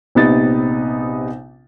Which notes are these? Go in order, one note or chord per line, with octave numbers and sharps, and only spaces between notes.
A#1 C3 B3 D#4 A6